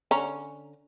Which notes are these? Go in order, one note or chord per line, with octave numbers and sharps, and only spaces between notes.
D3 C#4 A#5